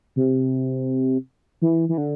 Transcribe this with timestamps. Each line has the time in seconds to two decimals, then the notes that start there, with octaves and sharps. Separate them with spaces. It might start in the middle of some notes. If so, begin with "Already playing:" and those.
0.16 C3
1.62 E3
1.89 E3
1.98 D3